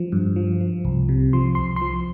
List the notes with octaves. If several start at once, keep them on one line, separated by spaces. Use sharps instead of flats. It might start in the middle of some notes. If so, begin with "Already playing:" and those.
Already playing: F3
G2
F3
F3
C2
C3
F3 C6
C2 C6
F3 C6